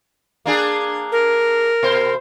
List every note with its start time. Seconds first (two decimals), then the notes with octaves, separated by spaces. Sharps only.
0.46 A#3 D4 G#4
1.12 A#4
1.83 B2 C5